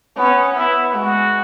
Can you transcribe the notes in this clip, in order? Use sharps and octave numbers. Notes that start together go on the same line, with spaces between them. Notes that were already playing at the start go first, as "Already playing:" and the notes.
B3 C#4
B3 E4
G#3 F#4